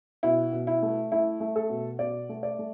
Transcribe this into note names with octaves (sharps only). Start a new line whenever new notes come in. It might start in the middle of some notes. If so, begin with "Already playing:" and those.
B2 E4
B2
E4
A3
A3 E4
A3
A4
B2
B2 D5
A3
D5
A3